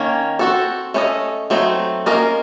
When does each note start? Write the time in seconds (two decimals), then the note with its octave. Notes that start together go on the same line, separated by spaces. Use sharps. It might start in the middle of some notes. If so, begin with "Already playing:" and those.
Already playing: D#3 A#3 C#4
0.39 C4 F#4 A4
0.94 A3 C#4 A4 C5 D#5
1.50 F#3 A3 C4 D#4
2.06 A#3 C#4 F4 A#4 D#5